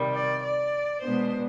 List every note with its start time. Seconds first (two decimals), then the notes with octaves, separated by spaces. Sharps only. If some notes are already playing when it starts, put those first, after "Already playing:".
Already playing: C3 D#3 G3
0.14 D5
0.44 D5
1.02 B2 G#3 B3 D4 C5